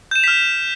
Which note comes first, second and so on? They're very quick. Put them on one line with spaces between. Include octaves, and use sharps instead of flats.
G6 E7 F7 B6 F6